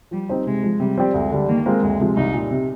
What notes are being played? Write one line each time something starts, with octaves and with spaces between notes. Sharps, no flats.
F3 G3
C4 D#4 G4 C5
C3 G#3
F3 G#3
C3 G3
F3 C4 G4 D5
D2 G#3
D3 G3
D#3 A#3
G#3 C4 F4 A#4
D2 G#3
C3 F3 G#3
C2 D#4
A#2 G3
C3